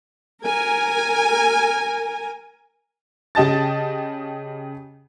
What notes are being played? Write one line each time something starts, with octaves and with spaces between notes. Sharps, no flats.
A#4 G#5
C#3 G4 D#5 A5 A6